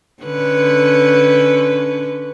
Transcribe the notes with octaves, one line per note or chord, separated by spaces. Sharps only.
D3 C#4 B4